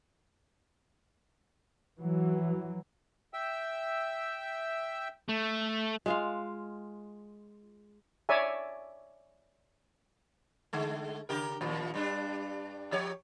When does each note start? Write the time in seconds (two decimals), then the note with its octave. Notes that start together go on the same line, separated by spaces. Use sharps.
1.98 E3 F#3
3.34 E5 G5 E6
5.28 A3
6.06 G#3 F4 F5
8.29 C#5 D5 E5 G#5
10.73 D3 G#3 A3
11.29 C#3 G4 A#4
11.61 D#2 A#2 F3
11.94 G2 G3 D4
12.92 F3 G4 C#5